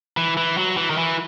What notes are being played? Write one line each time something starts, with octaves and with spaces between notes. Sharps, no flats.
E3
E3
F#3
E3
D#3
E3